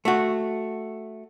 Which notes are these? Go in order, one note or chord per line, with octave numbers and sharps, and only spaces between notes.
A3 F#4